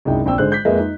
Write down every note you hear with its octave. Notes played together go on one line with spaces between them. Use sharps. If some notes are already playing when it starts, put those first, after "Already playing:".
C2 F#2 G#3 D#4 E4 G5
A#1 C4 G5 E6
G#2 D3 G#3 C5 F#6
G6 B6
F2 G#3 A#3 B4 D#5 E5
D#4